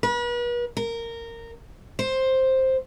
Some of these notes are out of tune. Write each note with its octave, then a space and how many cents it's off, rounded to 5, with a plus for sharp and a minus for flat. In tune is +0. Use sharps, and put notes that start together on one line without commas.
B4 -40
A#4 -15
C5 +5